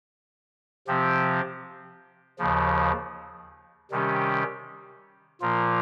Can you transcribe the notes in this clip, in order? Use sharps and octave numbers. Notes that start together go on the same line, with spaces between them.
C3 F3 C4 G4
D#2 C#3 F3
C3 D#3 G3 C#4 G4
A#2 F3 A#3 F4